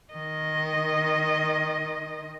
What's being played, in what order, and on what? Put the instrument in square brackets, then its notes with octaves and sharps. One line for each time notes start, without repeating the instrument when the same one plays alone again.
[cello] D#3 D#5